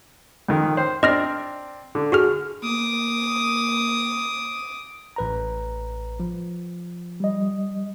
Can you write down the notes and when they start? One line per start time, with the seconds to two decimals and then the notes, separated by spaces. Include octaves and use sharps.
0.48 F2 D#3
0.77 C5
1.03 C4 D4 D5 D#5 F6 A#6
1.95 D3
2.12 F#4 G#4 F6
2.64 A#3 D6 D#6
5.16 A1 B4 A#5
6.20 F3
7.20 G3 D#5